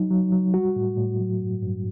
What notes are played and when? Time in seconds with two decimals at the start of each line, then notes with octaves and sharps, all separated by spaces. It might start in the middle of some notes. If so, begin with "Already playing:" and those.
Already playing: F#3 D#4
0.10 F#3
0.32 F#3
0.54 G3 F#4
0.76 A2
0.97 A2
1.20 F#3
1.41 G2
1.63 G2